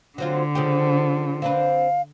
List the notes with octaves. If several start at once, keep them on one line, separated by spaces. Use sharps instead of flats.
D3 F#3 C4 F4
C#3 F3 G4
C4 D4 B4 F5